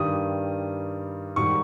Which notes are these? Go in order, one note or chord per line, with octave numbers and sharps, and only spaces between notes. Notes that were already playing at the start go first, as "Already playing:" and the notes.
Already playing: G2 D#3 G3 D#6
G#2 D#3 G3 C#6